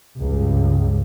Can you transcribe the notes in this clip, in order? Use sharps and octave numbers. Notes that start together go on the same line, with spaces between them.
C#2 G2